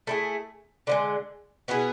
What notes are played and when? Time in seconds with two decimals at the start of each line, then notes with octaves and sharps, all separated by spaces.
0.07 A3 E4 G#4
0.87 D3 F3 G#3
1.68 B2 B3 E4 G#4